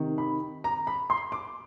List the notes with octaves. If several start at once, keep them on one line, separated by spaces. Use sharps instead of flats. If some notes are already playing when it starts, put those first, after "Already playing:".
Already playing: C3 D#3
B5
A#5
B5
C6
D6